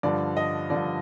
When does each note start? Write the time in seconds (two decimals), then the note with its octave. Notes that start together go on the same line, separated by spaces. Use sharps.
0.03 G2 D3 F3 D5
0.37 D#5
0.70 G2 D3 F3 D5